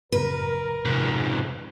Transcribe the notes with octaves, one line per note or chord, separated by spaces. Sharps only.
A1 F#2 C#3 A#4 B4
F2 G#2 C3